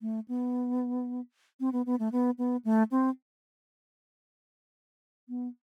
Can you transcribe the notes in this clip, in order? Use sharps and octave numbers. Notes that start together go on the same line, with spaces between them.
A3
B3
C4
B3
B3
A3
B3
B3
A3
C4
B3